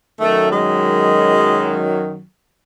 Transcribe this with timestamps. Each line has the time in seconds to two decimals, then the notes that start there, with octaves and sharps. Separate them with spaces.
0.19 F#2 D#3 F#3 A3
0.51 G#3